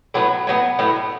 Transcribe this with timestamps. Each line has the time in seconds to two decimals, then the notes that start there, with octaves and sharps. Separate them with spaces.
0.14 A2 F#3 B3
0.47 A2 F#3 B3
0.79 A2 F#3 B3